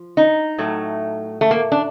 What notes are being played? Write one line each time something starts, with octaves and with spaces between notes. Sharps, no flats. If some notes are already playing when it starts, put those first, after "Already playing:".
Already playing: F3
D#4
A2 F#3 A3
A3
A#3
D4